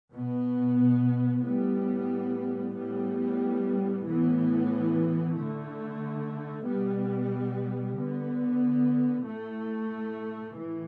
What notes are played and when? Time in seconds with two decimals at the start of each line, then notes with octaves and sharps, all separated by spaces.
0.13 B2 B3
1.43 A2 G3 B3
2.74 A2 G3 B3
4.04 A2 E3 B3
5.34 D3 A3
6.64 B2 G3 B3
7.94 D3 B3
9.25 A2 A3
10.55 A2 E3